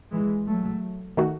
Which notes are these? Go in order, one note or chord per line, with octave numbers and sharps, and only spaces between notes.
E3 G#3
F#3 A3
D#3 A3 D#4 F#4